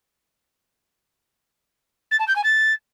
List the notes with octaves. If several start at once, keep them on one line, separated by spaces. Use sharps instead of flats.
A6
A5
G6
G#5
A6